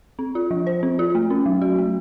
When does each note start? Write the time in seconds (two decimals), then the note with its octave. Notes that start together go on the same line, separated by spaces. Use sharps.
0.19 C4
0.35 F4
0.51 F3
0.67 C5
0.83 C4
0.99 F4
1.15 A3
1.30 C#4
1.46 F#3
1.62 F#4
1.78 A3